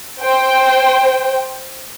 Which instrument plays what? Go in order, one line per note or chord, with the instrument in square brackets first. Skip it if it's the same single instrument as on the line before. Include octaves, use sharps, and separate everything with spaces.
[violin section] C5 G5